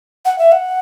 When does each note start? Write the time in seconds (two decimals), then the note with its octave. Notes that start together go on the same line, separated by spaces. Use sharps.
0.25 F#5
0.38 E5
0.52 F#5